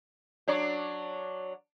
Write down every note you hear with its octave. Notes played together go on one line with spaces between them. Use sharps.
F#3 D4 C#5